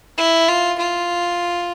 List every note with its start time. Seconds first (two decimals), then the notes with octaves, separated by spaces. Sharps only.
0.18 E4
0.49 F4
0.79 F4